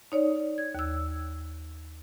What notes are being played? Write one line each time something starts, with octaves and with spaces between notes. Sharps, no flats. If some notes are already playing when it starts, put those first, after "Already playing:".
D#4 C#5 D5
G#6
D#2 E6